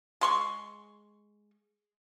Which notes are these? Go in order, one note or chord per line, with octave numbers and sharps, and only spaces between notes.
G#3 C6 C#6